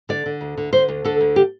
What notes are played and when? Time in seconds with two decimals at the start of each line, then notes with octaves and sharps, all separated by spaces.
0.09 D3 D5
0.26 D3
0.41 D2
0.57 D3
0.73 D3 C5
0.88 D2
1.04 D3 A4
1.21 D2
1.36 G4